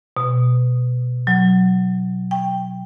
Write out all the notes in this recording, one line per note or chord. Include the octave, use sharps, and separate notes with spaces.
B2
F#3
G5